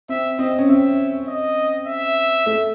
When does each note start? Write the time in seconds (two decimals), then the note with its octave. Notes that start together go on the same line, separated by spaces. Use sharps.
0.09 C4 E5
0.39 C4 D#5
0.58 C#4
0.69 C4 E5
1.28 D#5
1.87 E5
2.46 A3